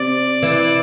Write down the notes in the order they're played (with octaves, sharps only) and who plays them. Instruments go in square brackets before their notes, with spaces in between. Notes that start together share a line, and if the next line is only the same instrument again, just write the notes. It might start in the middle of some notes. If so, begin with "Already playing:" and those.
Already playing: [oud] C3 [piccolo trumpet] D5
[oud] E3